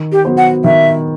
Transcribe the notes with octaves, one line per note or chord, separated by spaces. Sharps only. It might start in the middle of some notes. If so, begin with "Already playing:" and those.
Already playing: D#3
G4
F#3 B3 F#4 C5
F#5
D#3 E5